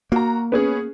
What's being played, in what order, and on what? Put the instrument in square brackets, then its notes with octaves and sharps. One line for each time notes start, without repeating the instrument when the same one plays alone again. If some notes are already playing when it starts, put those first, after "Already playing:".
[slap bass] A#3 [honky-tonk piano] F#4 A#5
[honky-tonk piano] B3 C#4 G#4